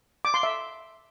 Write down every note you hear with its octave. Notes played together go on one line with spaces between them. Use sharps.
D6
C6
E5